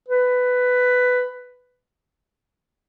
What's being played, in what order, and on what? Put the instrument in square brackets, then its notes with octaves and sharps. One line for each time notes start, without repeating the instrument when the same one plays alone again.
[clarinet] B4